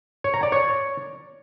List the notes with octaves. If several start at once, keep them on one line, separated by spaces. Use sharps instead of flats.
C#5
A#5
D5
C#5